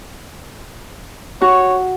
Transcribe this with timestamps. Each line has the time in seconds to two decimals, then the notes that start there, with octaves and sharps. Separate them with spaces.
1.41 F#4 C#5